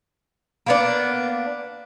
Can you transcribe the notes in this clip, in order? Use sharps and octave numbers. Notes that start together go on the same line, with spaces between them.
A#3 B3 D4